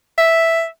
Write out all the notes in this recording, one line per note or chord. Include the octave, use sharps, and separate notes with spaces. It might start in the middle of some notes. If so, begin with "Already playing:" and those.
E5